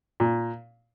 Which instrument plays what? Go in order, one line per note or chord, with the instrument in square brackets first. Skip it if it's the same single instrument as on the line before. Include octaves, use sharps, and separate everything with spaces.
[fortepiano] A#2